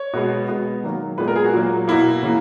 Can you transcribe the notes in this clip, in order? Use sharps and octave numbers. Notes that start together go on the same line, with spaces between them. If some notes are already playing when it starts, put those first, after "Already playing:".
Already playing: C#5
B2 G#3 B3
B2 G#3 B3
D#3 F#3 A#3
A#2 G#3 B3 B4
A#4
G#4
F#4
A#2 F#3 A#3
B2 A#3 E4
C#3 E3 A#3